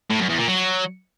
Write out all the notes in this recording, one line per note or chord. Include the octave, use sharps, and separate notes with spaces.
A2
F#2
E2
A#2
F#3